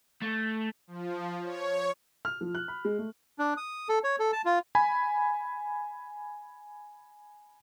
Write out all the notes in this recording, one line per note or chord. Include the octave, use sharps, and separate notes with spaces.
A3
F3
C#5
F6
F3
F#6
B5
G#3
A3
D4
D#6
A4
C#5
A4
A5
F4
G#5 B5